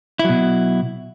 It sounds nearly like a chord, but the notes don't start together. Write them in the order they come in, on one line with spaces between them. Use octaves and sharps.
E4 F#3 B2